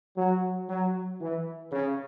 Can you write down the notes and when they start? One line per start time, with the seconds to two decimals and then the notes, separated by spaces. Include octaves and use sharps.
0.17 F#3
0.69 F#3
1.21 E3
1.72 C#3